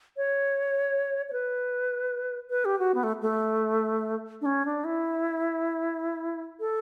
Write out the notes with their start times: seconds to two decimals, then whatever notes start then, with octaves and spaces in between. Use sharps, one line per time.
0.17 C#5
1.29 C#5
1.33 B4
2.50 B4
2.65 G4
2.79 F#4
2.95 B3
3.03 A3
3.22 A3
4.41 D4
4.46 C#4
4.65 D4
4.84 E4
6.60 A4